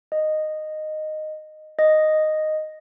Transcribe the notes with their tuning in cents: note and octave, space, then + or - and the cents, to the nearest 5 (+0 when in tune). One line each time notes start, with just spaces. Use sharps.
D#5 -10
D#5 -5